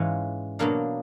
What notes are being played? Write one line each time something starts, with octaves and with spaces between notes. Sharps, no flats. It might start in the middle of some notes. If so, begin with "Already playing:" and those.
Already playing: G#2 E3 G#3 C#4 F4
B2 F#3 A#3 D4 F5